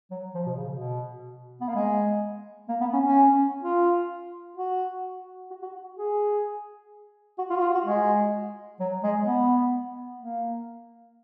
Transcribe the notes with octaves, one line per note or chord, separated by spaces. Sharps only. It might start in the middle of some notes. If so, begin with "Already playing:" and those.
F#3
F3
B2
C#3
B2
B3
A#3
G#3
A#3
B3
C#4
C#4
F4
F#4
F#4
F#4
G#4
F#4
F4
F#4
F4
F#4
G#3
F#3
G#3
B3
A#3